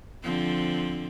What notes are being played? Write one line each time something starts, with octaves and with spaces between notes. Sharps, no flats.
D3 F3 C4